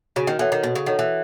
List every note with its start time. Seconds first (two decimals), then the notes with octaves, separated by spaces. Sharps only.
0.16 C#3 F#4
0.27 D#3
0.39 E3 A4 C#5 F#5
0.52 D#3
0.63 B2 F#4
0.75 C#3
0.86 D#3 A4 C#5 F#5
0.99 E3